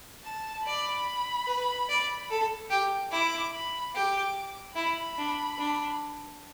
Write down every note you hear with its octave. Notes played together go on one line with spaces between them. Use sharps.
A5
D5 B5
B4
D5
A4
G4
E4 D6
B5
G4 D6
E4 B5
D4
D4